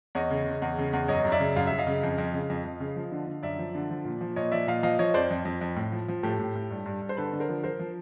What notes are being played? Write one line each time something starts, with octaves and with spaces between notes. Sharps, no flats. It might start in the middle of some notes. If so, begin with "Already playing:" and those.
E2 C#5 D#5
C#3
C#3
E2
C#3
E2
F#2 C#5 D#5
F#2
D5 E5
C#3
F#2 F5
F#2 E5
D#5 F5
C#3
F2
F2
C#3
F2
F2
C#3
F3
D3
D3
F#2 D5 E5
F3
D3
F3
A#2
F3
A#2 C#5 D#5
F3 D5 E5
A#2 D#5 F5
F3 D#5 F5
F3 C#5 D#5
F2 C5 D5
F2
F2
F2
A2
F3
F3
A2 G4 A4
A2
A2
G2
G2
G2
C5
D3 A4 B4
D3
A#4 C5
F3
F3 A#4 C5
F3